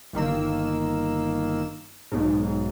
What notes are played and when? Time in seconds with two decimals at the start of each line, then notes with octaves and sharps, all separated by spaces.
0.13 G1 D#3 A#3 E6
2.12 B1 G#2